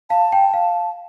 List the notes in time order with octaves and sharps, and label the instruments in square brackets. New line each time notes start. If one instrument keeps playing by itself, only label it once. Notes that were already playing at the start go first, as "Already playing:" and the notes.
[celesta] F5 [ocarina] A5
[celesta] G5
F5